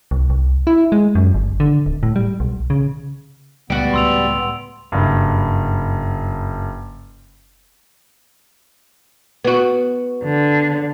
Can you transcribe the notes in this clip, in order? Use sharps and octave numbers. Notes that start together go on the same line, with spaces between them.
C2
C2
E4
G#3
F#2
G1
D3
D1
A2
G3
B1
C#3
C#2 G3 B3 F#4 D7
C#2 A2 C6 E6 F7
F#1 G2
B3 F#4
D3